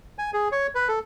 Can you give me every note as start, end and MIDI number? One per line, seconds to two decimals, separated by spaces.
0.19 0.31 80
0.33 0.49 68
0.52 0.67 73
0.75 0.88 71
0.88 0.99 69